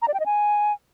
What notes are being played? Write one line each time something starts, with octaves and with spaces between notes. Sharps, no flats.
A#5
D5
G5
D#5
G#5